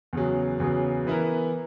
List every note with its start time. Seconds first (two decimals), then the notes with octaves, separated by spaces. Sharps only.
0.13 E2 C#3 F#3
0.60 E2 C#3 F#3
1.07 E3 B3 E4 A#4